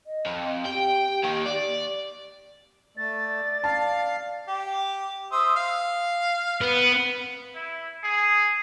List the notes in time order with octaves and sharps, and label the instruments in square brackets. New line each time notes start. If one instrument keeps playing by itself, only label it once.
[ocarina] D#5
[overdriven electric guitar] F2
[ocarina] G4 [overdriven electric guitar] G5
[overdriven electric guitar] D#2 D#3
D5
[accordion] A3 [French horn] D5 [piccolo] A6
[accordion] F5 [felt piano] A5
[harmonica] G4
C5 E5 D#6
F5
[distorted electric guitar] B3
[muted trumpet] E4
G#4